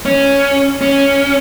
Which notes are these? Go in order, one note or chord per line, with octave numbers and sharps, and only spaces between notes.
C#4
C#4